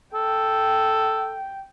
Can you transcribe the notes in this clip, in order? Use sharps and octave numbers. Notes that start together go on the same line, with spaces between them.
A4 G5